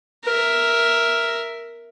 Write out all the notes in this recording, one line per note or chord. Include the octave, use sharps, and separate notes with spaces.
A#4 E5